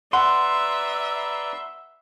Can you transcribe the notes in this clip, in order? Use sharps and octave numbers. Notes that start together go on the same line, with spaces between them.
B4 D5 E5 F#5 A#5 C6